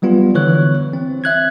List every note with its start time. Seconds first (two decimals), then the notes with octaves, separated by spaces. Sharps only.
0.02 F#3 G3 B3 F4
0.34 D3 E3 C#5 F#6
0.93 C4
1.24 E5 F#6 G#6